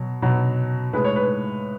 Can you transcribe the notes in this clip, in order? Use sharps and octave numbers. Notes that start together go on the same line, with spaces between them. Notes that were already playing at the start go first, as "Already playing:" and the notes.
Already playing: B2 F#3
B2 F#3
A2 G#3 B4
C#5
B4